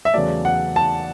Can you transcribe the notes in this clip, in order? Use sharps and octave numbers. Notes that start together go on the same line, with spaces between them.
E5
E2 C#3 F#3 A3 D5
F#5
A5